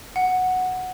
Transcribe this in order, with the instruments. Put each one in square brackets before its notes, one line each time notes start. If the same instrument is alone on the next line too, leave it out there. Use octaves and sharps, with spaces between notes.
[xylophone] F#5